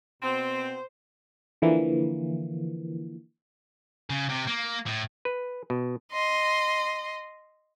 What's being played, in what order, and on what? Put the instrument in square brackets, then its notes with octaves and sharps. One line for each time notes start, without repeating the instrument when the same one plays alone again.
[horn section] B2 C4 [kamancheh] C5
[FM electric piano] D3 E3 F3 A#3
[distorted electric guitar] C#3
C3
A#3
A2
[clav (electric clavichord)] B4
B2
[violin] D#5 C6